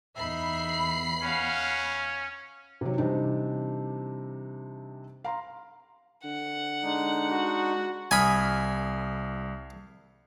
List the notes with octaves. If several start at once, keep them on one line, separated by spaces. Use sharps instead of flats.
E2 D#4 E5 B5 C7
C#4 F5 F#5
C3 D#3 F#3
C3 E3 G3 C4 D4 D#4
F5 A#5 C6
D3 F#5
G#3 D4 D#4
F#4
C2 G#5 B5 D#6 F6